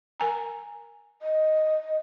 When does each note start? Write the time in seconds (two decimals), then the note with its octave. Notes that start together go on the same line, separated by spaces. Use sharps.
0.20 A#4 G#5 A#5
1.22 D#5